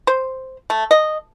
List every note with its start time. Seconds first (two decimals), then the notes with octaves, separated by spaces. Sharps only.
0.07 C5
0.70 A3
0.91 D#5